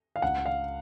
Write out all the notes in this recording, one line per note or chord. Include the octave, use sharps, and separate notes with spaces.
F5
C#2 F#5
F5